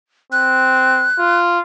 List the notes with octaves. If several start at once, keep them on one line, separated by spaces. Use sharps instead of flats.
C4 F#6
F4